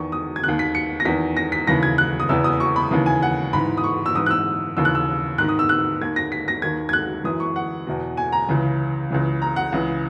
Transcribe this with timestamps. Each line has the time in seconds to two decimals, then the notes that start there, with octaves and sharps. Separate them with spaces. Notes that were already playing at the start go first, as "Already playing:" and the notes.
Already playing: E2 D#3 C#6
0.12 D#6
0.36 G#6
0.44 D#2 D#3 F#6
0.59 B6
0.75 C#7
1.00 A#6
1.05 E2 D#3 B6
1.37 A#6
1.52 B6
1.67 D#2 C#3 E3 A#6
1.83 G#6
1.98 F#6
2.20 D#6
2.29 E2 C#3 E3 E6
2.44 D#6
2.60 C#6
2.76 B5
2.91 D#2 C#3 E3
3.06 G#5
3.22 F#5
3.53 G#2 E3 B5
3.77 D#6
3.84 C#6
4.06 E6
4.15 G#2 E3 D#6
4.26 F#6
4.31 E6
4.77 D#2 C#3 E3 E6
4.85 F#6
4.95 E6
5.38 G#2 D#3 F#6
5.49 D#6
5.59 E6
5.69 F#6
6.01 D#2 D#3 G#6
6.16 A#6
6.32 B6
6.48 A#6
6.62 D#2 D#3 G#6
6.89 G#6
6.93 F#6
7.24 F#2 E3 D#6
7.40 C#6
7.56 F#5
7.87 E2 B2
8.17 G#5
8.32 A#5
8.48 C#2 C#3 E3
9.11 C#2 C#3 E3
9.42 A#5
9.56 F#5
9.72 C#2 C#3 E3